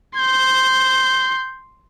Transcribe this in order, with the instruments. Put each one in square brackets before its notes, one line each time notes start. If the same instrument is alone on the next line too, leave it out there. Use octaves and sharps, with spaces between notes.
[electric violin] C6 [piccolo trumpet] G6